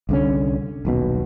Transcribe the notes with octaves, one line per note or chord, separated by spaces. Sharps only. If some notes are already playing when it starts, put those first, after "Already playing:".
C2 D3 C#4
D#1 B1 B2